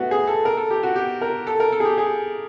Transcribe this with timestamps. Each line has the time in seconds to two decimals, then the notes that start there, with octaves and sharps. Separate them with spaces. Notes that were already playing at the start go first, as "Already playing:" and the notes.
Already playing: A3 B3 F#4
0.11 G#4
0.27 A4
0.45 A#4
0.57 A4
0.70 G4
0.83 F#4
0.96 G4
1.21 A#4
1.47 A4
1.60 A#4
1.72 A4
1.80 G#4
1.85 G4
1.98 G#4